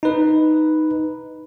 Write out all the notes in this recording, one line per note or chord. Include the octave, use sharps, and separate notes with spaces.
D#4 B4